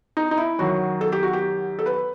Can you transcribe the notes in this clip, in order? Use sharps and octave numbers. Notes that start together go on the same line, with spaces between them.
D#4
D#4
E4
F#2 D#3 F#3 F#4
A4
G4
F#4
G4
A4
B4